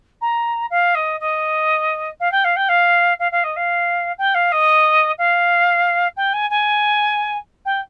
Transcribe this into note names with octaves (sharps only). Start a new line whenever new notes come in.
A#5
F5
D#5
D#5
F5
G5
F5
G5
F5
F5
F5
D#5
F5
G5
F5
D#5
F5
G5
G#5
G#5
G5